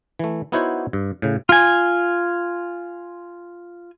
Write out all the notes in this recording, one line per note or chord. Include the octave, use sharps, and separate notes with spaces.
E3 A3
B3 D#4 E4 F#4 C5 C#5
G2
A2 C#3
F4 G#5